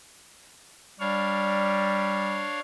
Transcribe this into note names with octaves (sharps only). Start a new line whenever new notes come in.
G3 D4 C#5 F5